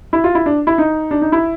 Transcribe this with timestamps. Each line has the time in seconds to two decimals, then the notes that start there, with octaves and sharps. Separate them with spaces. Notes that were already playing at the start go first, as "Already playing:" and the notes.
0.13 E4
0.24 F4
0.35 E4
0.46 D4
0.67 E4
0.78 D#4
1.11 D4
1.22 D#4
1.32 E4